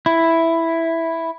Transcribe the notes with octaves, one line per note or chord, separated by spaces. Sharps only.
E4